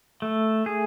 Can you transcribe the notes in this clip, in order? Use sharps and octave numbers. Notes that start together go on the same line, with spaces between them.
A3
G#4